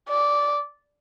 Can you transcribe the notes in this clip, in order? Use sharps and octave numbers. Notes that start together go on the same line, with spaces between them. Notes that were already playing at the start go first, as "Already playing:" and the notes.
D5